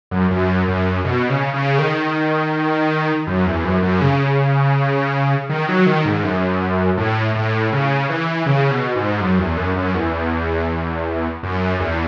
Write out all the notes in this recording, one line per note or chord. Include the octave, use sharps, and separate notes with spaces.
F#2
F#2
F#2
B2
C#3
C#3
D#3
F#2
E2
F#2
F#2
C#3
D#3
F#3
D#3
G#2
F#2
A2
A2
C#3
E3
C#3
B2
G#2
F#2
E2
F#2
F#2
E2
F#2
E2